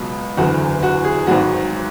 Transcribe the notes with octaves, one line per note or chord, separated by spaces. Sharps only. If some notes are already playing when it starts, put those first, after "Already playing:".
Already playing: C#2 B2 F#3
F#1 E2 D3 F#4
F#4
G#4
G#1 G#2 F#3 F#4